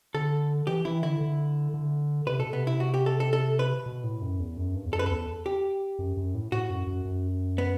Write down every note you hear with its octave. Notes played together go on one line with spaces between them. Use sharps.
D3 A4
E3 G4
E3 E4
D3 E4
D3
D3
C3 B4
B2 A4
C3 B3
E4
F#4
G4
A4
A4
A4
B4
B2
A2
F#2
E2
F#2
G2
E2
F#2 A4
B4
E2 A4
G4
F#2
F#2
A2
A2 F#4
F#2
F#2
F#2
B3